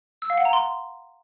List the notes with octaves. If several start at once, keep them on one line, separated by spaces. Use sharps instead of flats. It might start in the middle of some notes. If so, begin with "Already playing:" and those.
E6
F5
F#5
A#5
C6